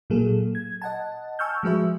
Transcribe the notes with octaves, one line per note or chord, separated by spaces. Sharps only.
A#2 F#3 A#3 G#4 A4
G#6
D#5 F#5 A5
G#5 A5 C#6 E6 F6 G6
F3 G#3 F#4 B4 E5